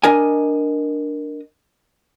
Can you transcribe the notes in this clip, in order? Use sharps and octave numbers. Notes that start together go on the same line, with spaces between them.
D4 A#4 D#5 G#5